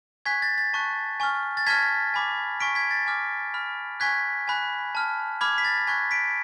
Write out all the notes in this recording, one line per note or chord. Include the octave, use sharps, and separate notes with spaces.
G#5 C#6 F#6 G#6 B6
A6
A6
A5 C#6 F#6
G#5 C#6 F6
A6
A5 C#6 F6 G#6 B6
G#5 B5 D6
G#5 C#6 F6 B6 D7
G#6 B6
A6
G#5 D6 F6
B5 F6
G#5 C#6 F#6 G#6 B6
G#5 B5 F#6
A5 F6
B5 D6 F6 G#6
B6
A6
G#5 C#6 F#6 G#6 B6
B6 D7